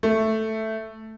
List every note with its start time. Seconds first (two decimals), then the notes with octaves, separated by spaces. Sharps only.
0.03 A3